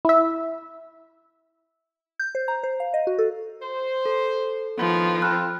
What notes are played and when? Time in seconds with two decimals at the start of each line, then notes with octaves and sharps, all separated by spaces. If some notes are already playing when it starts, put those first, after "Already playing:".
0.05 E4 E5
2.20 G6
2.35 C5
2.48 A#5
2.63 C5
2.80 F5
2.94 D#5
3.07 F#4
3.19 A4
3.62 C5
4.06 A4
4.78 A2 D#3 F3 B3
5.22 C4 A4 B5 F6 F#6